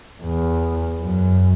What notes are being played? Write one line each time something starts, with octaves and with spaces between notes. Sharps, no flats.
E2
F#2